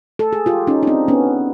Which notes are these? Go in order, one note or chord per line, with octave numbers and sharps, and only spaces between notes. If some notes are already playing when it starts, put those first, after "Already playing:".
A4
G#4
F4 G4
C#4 D#4
D#4
C4 D4
B3 C#4